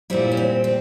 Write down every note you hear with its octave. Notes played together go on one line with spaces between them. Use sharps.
A#2 G3 C4 E4
C#4
C4
C4